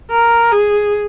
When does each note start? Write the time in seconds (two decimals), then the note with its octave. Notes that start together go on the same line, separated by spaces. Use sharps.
0.12 A#4
0.52 G#4